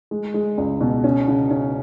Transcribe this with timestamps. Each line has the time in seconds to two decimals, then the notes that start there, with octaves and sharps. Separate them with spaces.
0.11 G#3
0.34 G#3
0.58 C#2
0.81 B2
1.04 C#4
1.28 C#3
1.51 C#4